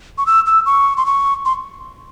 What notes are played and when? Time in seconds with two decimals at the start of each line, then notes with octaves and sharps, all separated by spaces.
0.18 C#6
0.26 E6
0.46 E6
0.66 C#6
0.97 C6
1.06 C#6
1.45 C6